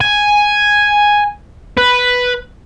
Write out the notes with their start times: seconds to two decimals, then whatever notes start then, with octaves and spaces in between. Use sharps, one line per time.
0.01 G#5
1.77 B4